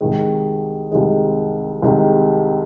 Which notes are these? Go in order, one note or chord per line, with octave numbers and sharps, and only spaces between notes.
C2 C3 D#3 G#3
C2 C3 D#3 G#3
C2 C3 D#3 G#3